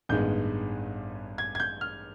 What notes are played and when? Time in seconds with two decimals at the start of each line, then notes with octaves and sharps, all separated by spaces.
0.09 A1 G2 D#3 G#3 B3 G6
1.38 G#6
1.55 G#6
1.60 G6
1.81 F6